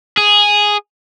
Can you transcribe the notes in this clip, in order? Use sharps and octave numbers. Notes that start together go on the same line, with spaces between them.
G#4